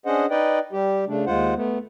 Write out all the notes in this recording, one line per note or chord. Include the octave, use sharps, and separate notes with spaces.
C#4 D4 G#4 C5 D#5 F#5
D#4 B4 D5 D#5 G5
G3 G4
C#3 A3 D4
D#2 G#3 F4 C5 F#5
A3 B3